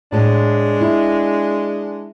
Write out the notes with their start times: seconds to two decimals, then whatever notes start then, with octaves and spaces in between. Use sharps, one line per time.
0.12 A2 G#3 D4 F5 A5
0.81 E4